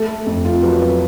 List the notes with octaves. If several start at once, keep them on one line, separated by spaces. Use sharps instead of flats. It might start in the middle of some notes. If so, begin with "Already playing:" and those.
Already playing: A3 A4
F2
F4
F#3 B4
B4